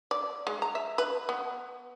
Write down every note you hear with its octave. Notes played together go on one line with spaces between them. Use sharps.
D5
G#3
A#5
E5
B4
B3